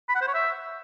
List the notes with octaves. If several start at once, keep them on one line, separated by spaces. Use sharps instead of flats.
B5
F#5
C5
C#5
E5